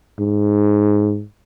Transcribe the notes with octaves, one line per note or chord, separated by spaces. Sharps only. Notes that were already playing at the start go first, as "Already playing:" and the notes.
G#2